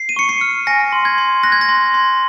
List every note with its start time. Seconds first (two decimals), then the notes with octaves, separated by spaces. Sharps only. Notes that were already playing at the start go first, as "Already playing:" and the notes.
Already playing: C7
0.09 D#7
0.16 C#6 C#7
0.29 C7
0.41 F6
0.67 G#5 A#6
0.92 C6
1.05 G#6
1.18 C6
1.43 F#6 A#6
1.52 G#6
1.61 A#6
1.69 C6
1.94 C6